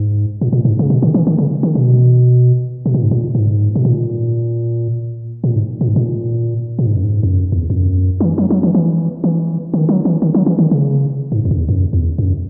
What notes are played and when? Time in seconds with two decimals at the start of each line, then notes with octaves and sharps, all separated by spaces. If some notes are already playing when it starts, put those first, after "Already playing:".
Already playing: G#2
0.41 A#2
0.53 A#2
0.65 G#2
0.79 C#3
0.90 B2
1.02 D#3
1.14 E3
1.27 D#3
1.39 C#3
1.63 D#3
1.75 B2
2.86 B2
2.94 A#2
3.03 G#2
3.11 A#2
3.35 G#2
3.75 B2
3.85 A#2
5.44 A#2
5.55 G#2
5.81 A#2
5.88 G#2
5.96 A#2
6.79 A#2
6.86 G#2
6.96 F#2
7.03 G#2
7.23 E2
7.28 F#2
7.52 E2
7.70 E2
7.76 F#2
8.20 F#3
8.25 E3
8.38 F#3
8.50 F#3
8.63 E3
8.75 E3
9.24 E3
9.74 D#3
9.89 F#3
10.05 E3
10.22 D#3
10.34 F#3
10.46 E3
10.59 D#3
10.71 C#3
11.32 G#2
11.45 E2
11.51 F#2
11.57 E2
11.69 F#2
11.93 E2
12.18 F#2